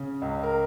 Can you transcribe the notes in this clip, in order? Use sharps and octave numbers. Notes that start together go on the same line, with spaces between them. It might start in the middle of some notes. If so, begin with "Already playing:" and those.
Already playing: C#3
C#2
A#4